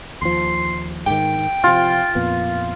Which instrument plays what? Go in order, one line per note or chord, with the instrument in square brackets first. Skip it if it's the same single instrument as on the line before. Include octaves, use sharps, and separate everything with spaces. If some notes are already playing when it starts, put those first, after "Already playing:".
[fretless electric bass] D#2 F3 [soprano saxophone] C6
[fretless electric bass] G#2 D#3 [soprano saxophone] G5
[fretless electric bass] C3 F3 [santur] F4
[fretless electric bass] F2 A#2 B3